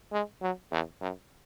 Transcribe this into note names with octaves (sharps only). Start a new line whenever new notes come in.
G#3
F#3
E2
F#2